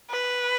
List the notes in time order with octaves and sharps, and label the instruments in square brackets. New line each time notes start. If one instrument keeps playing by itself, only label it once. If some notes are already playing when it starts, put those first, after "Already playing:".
[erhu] B4